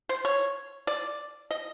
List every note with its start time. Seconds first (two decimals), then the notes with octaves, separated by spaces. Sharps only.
0.09 C5
0.25 C#5
0.87 D5
1.51 D#5